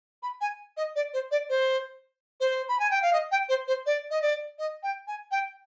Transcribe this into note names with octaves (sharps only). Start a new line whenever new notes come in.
B5
G#5
D#5
D5
C5
D5
C5
C5
B5
G#5
G5
F5
D#5
G5
C5
C5
D5
D#5
D5
D#5
G5
G#5
G5